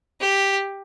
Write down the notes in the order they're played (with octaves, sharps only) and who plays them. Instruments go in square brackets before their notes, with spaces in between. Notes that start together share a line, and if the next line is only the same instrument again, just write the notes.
[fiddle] G4